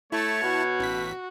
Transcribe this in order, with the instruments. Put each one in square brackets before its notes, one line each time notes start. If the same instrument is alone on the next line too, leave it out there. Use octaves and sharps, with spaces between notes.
[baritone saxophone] A3 [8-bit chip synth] E4 A5 [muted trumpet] C#5
[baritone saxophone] B2 [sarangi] F#4
[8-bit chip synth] A1 B6